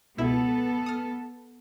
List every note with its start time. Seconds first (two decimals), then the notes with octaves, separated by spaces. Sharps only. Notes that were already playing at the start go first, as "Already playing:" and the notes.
0.18 C#2 B2 B3 E4 A4
0.86 D#6 F6